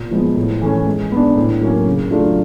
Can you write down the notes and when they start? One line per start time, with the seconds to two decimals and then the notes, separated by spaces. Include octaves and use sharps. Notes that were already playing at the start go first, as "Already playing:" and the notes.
Already playing: A#2
0.11 F3 G#3 B3
0.36 A2
0.61 E3 A3 C#4
0.87 G#3
1.12 B3 D4
1.36 A2
1.61 F#3 A#3 C#4
1.87 C#3
2.11 F#3 A3 D4 F4